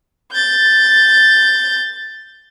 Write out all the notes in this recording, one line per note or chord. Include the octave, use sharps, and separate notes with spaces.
G6 A6